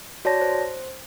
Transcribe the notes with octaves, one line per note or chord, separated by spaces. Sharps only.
F#4 C#5 D5 A5 A#6
C5